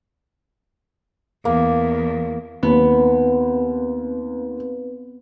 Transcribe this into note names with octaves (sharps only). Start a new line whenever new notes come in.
E2 A#3
D#2 B3 C4 B4 F5